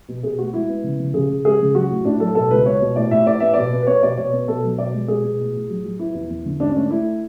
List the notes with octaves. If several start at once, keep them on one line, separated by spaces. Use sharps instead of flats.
B2
B2 G#4
A3 F#4
G#3 E4
B3
C#3
C#3
C#3 G#4
C#3
G#3 G#4
C#3
F#3 F#4
A2
A2 D4
F#3 A4
B2 A4
C#2 B4
B3 C#5
B2
A2 D5
A2 E5
A2 D5
B3 E5
B2 D5
B3
B4
B3 C#5
B2 D5
B2 C#5
B3
B2 A4
F#3
B2 D5
G#3
B2 G#4
B2
A2
A2
F#3
F#3
B3 E4
E2
E2
D3
G#2 D4
C#4
A3 D4
A3 E4